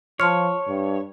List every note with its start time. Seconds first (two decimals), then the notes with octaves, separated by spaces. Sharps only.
0.20 F3 C#5 A5 C6 F6
0.68 G2